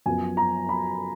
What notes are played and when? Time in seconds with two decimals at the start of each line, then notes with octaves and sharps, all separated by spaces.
0.06 F#2 F3 B3 G#5
0.37 A#5
0.69 B5